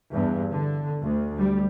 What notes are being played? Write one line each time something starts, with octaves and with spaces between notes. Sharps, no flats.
E2 G2
D3
D2
G3